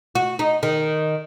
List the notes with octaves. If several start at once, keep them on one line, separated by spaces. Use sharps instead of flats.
F#4
D#4
D#3